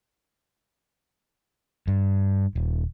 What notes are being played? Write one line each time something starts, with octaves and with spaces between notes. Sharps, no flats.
G2
D#1